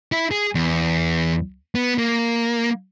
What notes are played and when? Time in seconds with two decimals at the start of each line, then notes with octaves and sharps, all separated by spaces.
0.12 E4
0.31 G#4
0.55 E2
1.75 B3
1.98 A#3